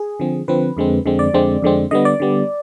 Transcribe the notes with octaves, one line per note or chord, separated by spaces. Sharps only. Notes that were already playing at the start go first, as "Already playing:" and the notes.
Already playing: G#4
D3 F3 C4
D3 F3 C4 B4
F2 D3 G#3 C4
F2 D3 G#3 C4
D5
F2 D3 G#3 C4
F2 D3 G#3 C4
D3 G3 B3 D#5
D5
D3 G3 B3